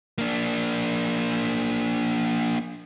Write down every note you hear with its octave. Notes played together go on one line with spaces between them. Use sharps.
A#3 D4